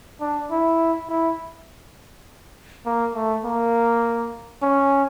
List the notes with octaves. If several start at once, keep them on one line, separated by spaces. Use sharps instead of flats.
D4
E4
E4
A#3
A3
A#3
C#4